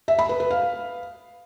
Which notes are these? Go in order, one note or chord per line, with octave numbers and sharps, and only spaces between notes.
E5
B5
B4
B4
F5